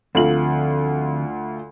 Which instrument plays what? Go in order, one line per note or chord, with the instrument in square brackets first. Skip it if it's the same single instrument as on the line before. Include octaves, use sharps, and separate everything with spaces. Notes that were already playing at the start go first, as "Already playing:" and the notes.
[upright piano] D2 F4 F#7 [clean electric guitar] D3 F3 C4